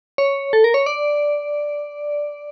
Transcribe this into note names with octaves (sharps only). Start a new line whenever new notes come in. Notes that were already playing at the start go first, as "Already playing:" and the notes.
C#5
A4
A#4
C#5
D5